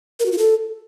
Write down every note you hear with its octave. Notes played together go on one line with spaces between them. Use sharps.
A#4
F#4
F4
A4